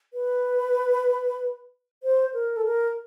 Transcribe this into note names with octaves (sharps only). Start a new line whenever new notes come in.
B4
C5
A#4
A4
A#4